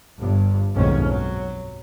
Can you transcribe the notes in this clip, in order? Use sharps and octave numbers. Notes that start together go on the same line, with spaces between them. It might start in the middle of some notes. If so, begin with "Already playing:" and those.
G1 G2
B1 F2 G#2 D#3 C#4
F#3